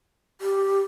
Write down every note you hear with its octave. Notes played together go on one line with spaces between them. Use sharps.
G4